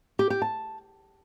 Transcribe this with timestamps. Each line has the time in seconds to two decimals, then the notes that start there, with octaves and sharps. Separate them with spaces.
0.19 G4
0.30 G4
0.42 A5